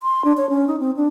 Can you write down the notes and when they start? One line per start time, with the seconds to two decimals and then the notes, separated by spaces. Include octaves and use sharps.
0.03 C6
0.25 D4
0.37 C#5
0.50 C#4
0.68 D#4
0.80 C4
0.97 D4